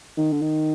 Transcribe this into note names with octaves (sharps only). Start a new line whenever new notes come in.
D#3
D3
D#3